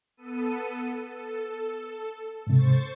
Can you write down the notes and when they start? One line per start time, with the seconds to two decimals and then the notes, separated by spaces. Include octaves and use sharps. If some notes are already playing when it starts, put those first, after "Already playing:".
0.17 B3 A4 D#7
1.05 A4
2.47 G#2 C3 C5 C#6 A6